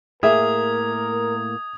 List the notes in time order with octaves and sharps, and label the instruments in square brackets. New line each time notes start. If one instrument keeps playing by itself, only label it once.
[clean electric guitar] A2 A#3 [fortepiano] G#4 E5 [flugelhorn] A#4 [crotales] D#6 G#6